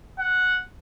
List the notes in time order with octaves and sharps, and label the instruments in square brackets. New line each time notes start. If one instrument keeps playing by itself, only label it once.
[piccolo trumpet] F#5